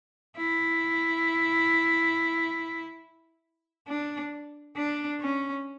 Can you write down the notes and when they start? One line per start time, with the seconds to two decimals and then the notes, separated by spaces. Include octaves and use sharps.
0.37 E4
3.88 D4
4.77 D4
5.21 C#4